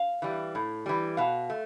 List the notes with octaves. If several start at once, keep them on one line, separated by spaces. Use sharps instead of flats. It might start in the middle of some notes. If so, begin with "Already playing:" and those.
Already playing: F5
E3 G3
A2
E3 G3
B2 F5
A3